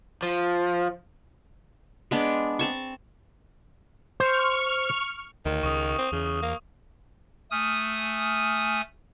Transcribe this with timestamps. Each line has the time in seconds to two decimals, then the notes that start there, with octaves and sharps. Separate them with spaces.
0.23 F3
2.11 G#3 B3 D4
2.59 C4 A5 C#6
4.20 C5 C#6 F6
5.46 D2 D#3
5.63 C#2 C#3 C#6 D#6
5.98 C4
6.12 E2 C#3
6.42 A#3
7.51 A3 G#5 D#6 F6